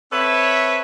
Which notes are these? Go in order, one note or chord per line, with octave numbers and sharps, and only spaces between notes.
C4 A4 B4 C#5 E5